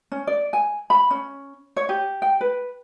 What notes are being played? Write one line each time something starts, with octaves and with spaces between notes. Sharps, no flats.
C#4
D5
G#5
B5
C#4
C#5
G4
G5
B4